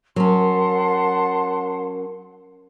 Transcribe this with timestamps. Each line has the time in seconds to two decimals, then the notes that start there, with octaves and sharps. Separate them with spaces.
0.16 F#3 C#4 A#4 F#5 A5 C6